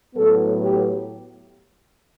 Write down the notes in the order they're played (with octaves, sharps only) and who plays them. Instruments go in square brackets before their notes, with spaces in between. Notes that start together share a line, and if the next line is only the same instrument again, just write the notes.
[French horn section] A2 F#3 B3 A4
G4